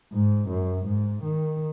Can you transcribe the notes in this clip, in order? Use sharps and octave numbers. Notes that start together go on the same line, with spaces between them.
G#2
F#2
G#2
D#3